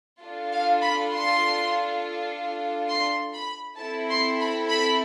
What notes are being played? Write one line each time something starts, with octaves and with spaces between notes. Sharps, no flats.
D4 F4 A4
F5
B5
C6
C6
B5
C4 E4 A4 A5
C6
B5
B5